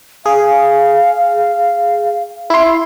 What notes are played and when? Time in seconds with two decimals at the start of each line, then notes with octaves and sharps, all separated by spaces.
0.26 G#4 F5
2.50 E4 C6